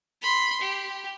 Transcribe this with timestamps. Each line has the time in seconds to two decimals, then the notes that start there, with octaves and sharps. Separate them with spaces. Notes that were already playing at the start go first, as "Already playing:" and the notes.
0.22 B5 C6
0.61 G4